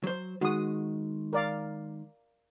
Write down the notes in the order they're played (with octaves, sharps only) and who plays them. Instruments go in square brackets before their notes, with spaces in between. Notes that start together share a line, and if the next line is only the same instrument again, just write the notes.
[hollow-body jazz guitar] F#3 C5
[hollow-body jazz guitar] D#3 G#3 [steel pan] F#4 D#6
[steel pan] A#4 D5 F5